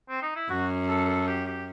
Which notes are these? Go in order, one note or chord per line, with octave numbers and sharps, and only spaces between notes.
C4
D#4
E4
F#2 F#4
A4
A4
G4
G4